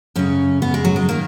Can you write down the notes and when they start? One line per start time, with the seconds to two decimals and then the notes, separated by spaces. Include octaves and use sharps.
0.16 F#2 C#3 C#4
0.62 B3
0.74 G#3
0.85 F#3
0.96 G#3
1.09 D#3 A#3